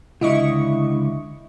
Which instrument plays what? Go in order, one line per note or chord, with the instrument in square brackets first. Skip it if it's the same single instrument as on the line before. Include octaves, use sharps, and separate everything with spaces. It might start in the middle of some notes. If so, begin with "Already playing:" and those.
[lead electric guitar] C#2 D3 [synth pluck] E4 D#5 C#6